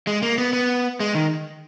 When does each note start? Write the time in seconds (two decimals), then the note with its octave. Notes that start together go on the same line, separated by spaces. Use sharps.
0.07 G#3
0.23 A#3
0.38 B3
0.53 B3
1.00 G#3
1.15 D#3